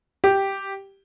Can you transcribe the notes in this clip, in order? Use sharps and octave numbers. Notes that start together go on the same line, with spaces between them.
G4